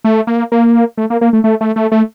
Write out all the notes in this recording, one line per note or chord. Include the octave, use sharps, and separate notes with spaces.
A3
A#3
A#3
A3
A#3
A#3
A3
A3
A3
A3
A3